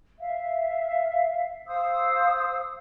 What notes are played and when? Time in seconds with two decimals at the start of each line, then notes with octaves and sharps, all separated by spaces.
0.19 E5 F5
1.67 C5 F5 D#6 E6